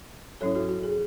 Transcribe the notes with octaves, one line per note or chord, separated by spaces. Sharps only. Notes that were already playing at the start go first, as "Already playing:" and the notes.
G#2 F#3 C#4 E4 A4 C#5
F#4 A4
F#4
G#4